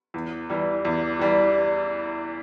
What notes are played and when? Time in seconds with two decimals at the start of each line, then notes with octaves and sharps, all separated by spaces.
0.14 E2
0.49 E3 G3
0.85 E2
1.19 E3 G3